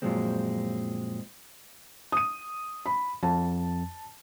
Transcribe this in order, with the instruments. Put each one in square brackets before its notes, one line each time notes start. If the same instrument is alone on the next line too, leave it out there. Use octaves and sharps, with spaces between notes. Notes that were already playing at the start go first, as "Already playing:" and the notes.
[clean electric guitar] F#2 A#2 F3 F#3 G#3 C4
[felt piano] D#6 D#7
B5
[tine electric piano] F2 [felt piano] A5